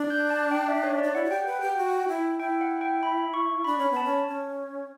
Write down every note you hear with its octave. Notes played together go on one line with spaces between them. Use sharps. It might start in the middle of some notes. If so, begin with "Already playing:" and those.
Already playing: D4
G6
A5
G5
E5
C#5
D5
D4
E4 F#5
F#4
G4 G5
B4 F#5
G4 G5
F#4
E4
E4 G5
F#5
G5
B5
C#6
D4 B5
C#4 B5
B3 A5
C#4
C#4